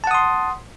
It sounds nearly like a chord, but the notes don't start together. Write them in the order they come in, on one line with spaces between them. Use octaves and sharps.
A5 F#5 D#6 C6